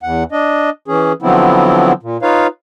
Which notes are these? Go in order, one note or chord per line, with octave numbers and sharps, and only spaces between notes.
E2 F#5
D4 D#5
E3 C#4 G#4
D3 F3 F#3 B3 C4 E4
A#2
D#4 F4 B4 C#5 F5